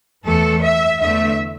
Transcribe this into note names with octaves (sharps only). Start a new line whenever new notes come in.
E2 E3 A3 A4
E5
E2 D3 A3 E5